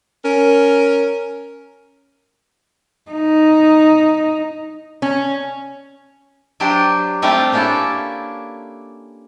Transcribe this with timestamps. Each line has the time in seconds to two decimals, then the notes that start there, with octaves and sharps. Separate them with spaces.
0.23 C#4 A#4
3.12 D#4
5.02 C#4
6.60 F#3 D4 G4 C5
7.22 G3 A3 C4 F4 G4 F5
7.52 A#3 C#4 D4 E4 F4 A4